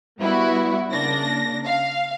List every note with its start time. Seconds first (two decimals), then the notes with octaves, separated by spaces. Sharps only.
0.20 G3 B3 E4 F#4
0.90 C#3 A#3 D4 A#6
1.65 F5